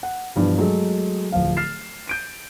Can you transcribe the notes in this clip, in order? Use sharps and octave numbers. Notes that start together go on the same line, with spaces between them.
F#5
G2 B2 E3 F3
F#3 G#3 A3 G#4 A4
D1 F3 F5
F6 A6 C7 E7
G6 D7 D#7